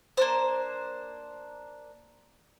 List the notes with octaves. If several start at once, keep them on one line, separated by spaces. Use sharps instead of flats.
A#3 D4 C5